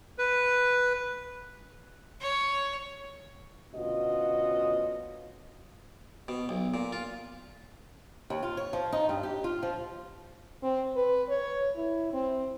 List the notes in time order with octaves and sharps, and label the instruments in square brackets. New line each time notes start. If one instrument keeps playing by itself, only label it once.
[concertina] B4
[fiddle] C#5
[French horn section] D2 B2 C#4 F4 F#4 D#5
[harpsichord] B2
B1
A#2
F4
[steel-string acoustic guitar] D#2
F4
C#5
F3
D#4
G2
G4
F4
F3
[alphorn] C4
B4
C#5
E4
C4